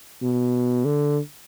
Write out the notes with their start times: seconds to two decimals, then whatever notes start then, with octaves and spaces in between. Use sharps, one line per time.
0.22 B2
0.85 D3